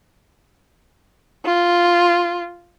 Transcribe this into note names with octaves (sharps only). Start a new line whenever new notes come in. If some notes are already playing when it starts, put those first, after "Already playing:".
F4